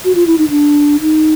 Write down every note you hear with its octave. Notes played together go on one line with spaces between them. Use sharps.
F#4
F4
E4
D#4
D4
D#4